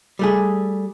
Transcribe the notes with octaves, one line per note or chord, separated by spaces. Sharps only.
G3 A3 G#4